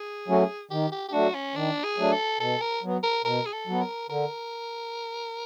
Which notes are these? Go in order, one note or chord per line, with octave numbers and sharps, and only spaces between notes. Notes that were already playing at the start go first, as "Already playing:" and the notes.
Already playing: G#4
F#3 A3 C#4
D#3 G4
G4
G4
F#3 A3 D4 F#4
C#4
D#3 D4
G#4
F#3 A3 D4
A4
B2 A4
A#4
F#3 B3
A#4
B2 A#4
G#4
A4
F#3 B3
A#4
D3 A#4